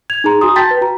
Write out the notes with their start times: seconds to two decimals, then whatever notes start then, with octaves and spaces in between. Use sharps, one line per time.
0.10 G#6 F7
0.24 D#4 G#4 A#5 C6
0.41 F#4 G#5 A#5 C6 D#6
0.56 G5 A5 C6 G6 A6 B6
0.69 B4 G5
0.81 F#4 A#5